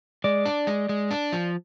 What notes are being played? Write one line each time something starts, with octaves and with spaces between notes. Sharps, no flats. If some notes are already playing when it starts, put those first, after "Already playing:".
G#3 D5
D4
G#3
G#3
D4
F3